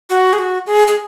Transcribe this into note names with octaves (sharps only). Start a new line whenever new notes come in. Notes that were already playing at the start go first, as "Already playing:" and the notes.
F#4
G#4
F#4
G#4
G#4